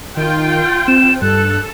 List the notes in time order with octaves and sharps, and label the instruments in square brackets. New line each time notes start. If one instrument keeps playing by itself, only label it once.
[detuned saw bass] D#3 [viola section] F4 G5
[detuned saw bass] C4 [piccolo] E7
[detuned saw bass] G2 [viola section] A4 [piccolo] F#6